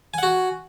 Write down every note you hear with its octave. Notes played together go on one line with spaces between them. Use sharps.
F#4 F#5 G#5